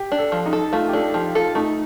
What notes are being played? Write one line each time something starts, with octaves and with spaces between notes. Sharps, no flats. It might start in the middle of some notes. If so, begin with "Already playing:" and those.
Already playing: G4
D4
A4
F3
D#4
A4
A3 F4
G4
D4 A4
F3 G4
F4 A4
A3 D#4